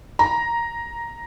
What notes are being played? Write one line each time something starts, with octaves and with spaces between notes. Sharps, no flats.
A#5